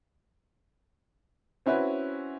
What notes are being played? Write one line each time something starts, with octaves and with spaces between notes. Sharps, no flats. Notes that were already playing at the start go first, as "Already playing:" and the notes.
C4 C#4 E4 F#4 B4